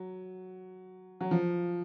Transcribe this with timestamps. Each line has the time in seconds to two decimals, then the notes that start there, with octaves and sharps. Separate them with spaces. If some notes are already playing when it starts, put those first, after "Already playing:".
Already playing: F#3
1.21 F#3
1.31 F3